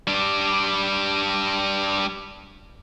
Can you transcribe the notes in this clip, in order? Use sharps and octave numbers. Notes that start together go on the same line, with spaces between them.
G3 D4